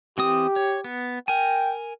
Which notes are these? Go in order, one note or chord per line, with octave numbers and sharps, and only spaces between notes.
E3 C4 G4 D#6
C#5
B3
A#4 G5 G#5